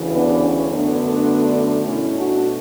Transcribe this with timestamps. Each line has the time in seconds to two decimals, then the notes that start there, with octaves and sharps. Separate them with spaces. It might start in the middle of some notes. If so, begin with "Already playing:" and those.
Already playing: D2 C#3 E3
0.15 B3 D4
0.45 C#4
0.72 F#2 D3 A3 B3 D4
1.87 B2 A3 C#4 E4
2.16 D4 F#4